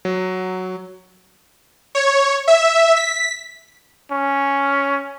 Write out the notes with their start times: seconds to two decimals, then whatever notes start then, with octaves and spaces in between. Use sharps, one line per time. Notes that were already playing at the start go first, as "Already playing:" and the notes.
0.05 F#3
1.95 C#5
2.48 E5
2.96 B6
4.11 C#4